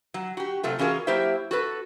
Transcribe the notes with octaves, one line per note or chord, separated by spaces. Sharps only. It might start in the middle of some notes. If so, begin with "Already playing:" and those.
F#3
F#4 G4
C3 F#3 A3 F4
E3 C#4 F4 F#4 G#4 A#4
F#3 A#3 E4 G4 C5 E5
F#4 A4 B4